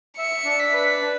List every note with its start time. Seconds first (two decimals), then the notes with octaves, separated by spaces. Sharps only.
0.18 E5 C#7
0.45 D4
0.60 B6
0.73 B4
1.02 D4